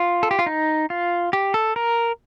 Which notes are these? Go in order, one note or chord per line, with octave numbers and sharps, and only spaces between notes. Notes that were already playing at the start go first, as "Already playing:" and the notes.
Already playing: F4
A4
G4
F4
D#4
F4
G4
A4
A#4